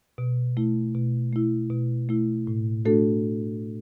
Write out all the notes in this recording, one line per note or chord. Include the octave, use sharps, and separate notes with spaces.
B2
A3 E4
B2
A3 E4
B2
A3 E4
A2
A3 D4 F#4 A4